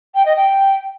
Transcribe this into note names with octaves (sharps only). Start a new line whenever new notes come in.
G5
D#5
G5